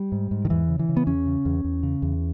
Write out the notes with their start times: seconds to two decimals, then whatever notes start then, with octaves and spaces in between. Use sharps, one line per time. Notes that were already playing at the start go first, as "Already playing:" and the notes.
Already playing: G3
0.12 G#2
0.31 G#2
0.45 D#3
0.50 E2 E3
0.69 C#3
0.79 E3
0.89 C#3
0.97 B3
1.07 E2 C#4
1.26 C#3
1.45 E2
1.64 E2
1.83 C#3
2.02 E2